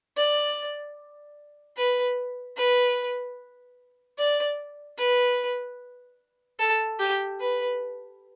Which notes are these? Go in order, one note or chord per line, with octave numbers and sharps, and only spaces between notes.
D5
B4
B4
D5
B4
A4
G4
B4